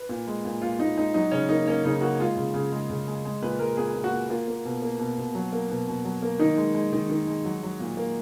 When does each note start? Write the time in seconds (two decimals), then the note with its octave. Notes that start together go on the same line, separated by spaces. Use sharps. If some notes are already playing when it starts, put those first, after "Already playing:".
Already playing: B4
0.09 A#2
0.27 G#3
0.45 A#2
0.62 A#2 F4
0.79 A#2 D#4
0.97 G#3 D#4
1.14 F#3 D#4
1.31 C#3 C#4
1.49 A#3 D#4
1.67 A#3 C#4
1.85 C#3 D#4
2.01 A#3 F#4
2.20 G#3 F4
2.37 C#3
2.54 C#3
2.72 G#3
2.90 C#3
3.08 G#3
3.25 G#3
3.42 A#2 B4
3.59 G#3 A#4
3.77 A#2 G#4
3.94 A#2
4.04 F#4
4.12 A#2
4.29 A#3 F4
4.48 A#3
4.65 B2
4.82 A#3
4.99 B2
5.18 B2
5.35 F#3
5.53 A#3
5.70 B2
5.88 B2
6.05 F#3
6.22 A#3
6.39 D#3 D#4
6.57 G#3
6.75 G#3
6.93 D#3
7.09 D#3
7.27 G#3
7.45 F#3
7.63 F#3
7.80 A#2
7.97 A#3